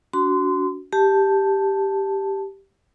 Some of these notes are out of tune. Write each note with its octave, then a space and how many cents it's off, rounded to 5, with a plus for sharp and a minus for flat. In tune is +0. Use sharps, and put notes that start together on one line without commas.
D4 -35 F#4 +0 C6 -25
G4 +0 A5 +0